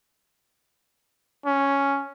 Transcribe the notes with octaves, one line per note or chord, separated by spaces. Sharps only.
C#4